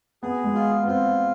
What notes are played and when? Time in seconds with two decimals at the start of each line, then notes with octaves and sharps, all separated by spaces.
0.23 B3 G#4
0.44 G#3
0.55 F4
0.83 B3
0.87 C4 F4